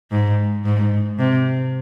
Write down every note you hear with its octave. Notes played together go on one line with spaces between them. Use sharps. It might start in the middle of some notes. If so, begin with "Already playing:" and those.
G#2
G#2
C3